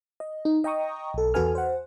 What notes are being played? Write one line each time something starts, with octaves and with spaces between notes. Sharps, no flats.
D#5
D#4
D#5 G5 A#5 C#6 D#6
B1 A4
E2 F#4 A4 B4 G#5 F6
C5 F#5